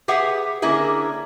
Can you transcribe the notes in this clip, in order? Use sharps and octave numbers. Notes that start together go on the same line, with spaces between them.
G4 G#4 B4 E5 F#5
D3 A#3 C#4 E4 G#4 A#4